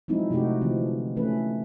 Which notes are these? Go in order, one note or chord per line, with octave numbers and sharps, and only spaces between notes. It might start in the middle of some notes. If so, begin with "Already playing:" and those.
F3 F#3 G#3 C4 D#4 E4
C3 A3 D#4 F#4 G4
D3 E3 F3 C4
C#3 E3 A3 C#4 B4